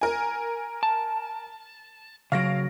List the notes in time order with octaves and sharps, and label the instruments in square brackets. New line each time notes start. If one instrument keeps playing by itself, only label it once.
[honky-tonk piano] A#4 G#5
[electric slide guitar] A5
[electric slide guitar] C#3 F#3 [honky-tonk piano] F5 A#6 D7